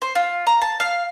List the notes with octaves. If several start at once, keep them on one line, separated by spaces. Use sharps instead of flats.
C5
F4
A#5
A5
F5